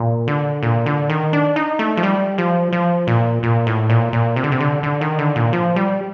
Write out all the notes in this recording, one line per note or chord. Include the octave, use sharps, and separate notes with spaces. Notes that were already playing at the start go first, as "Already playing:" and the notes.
Already playing: A#2
D3
A#2
D3
D#3
D4
D#4
A3
F3
G3
F3
F3
A#2
A#2
A2
A#2
A#2
C3
D3
C3
D3
D3
D#3
D3
A#2
F3
G3